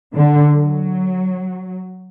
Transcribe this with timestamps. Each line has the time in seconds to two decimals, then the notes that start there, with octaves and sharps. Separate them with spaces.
0.14 D3
0.54 F#3